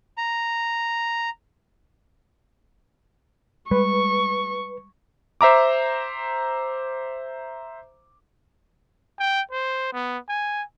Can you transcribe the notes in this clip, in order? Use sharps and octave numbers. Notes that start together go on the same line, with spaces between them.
A#5
G3 G#3 B4 C#6
C5 E5 A#5 D6
G5
C5
B3
G#5